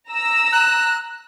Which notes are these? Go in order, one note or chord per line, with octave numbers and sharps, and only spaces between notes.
A#5 E6
F#6